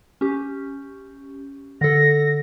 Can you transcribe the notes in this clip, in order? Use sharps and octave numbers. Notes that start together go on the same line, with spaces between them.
C#4 G4
D3 A4 A#6